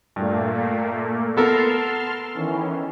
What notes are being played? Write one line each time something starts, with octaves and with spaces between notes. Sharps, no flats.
G2 A#2 A3 A#3
B3 A4 A#4 A5 C6 F6
D#3 E3 C#4